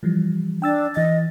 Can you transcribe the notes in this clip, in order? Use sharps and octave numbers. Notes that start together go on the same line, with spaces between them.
E3 F3 G3
D4 G5 E6 A6
E3 D#5 A6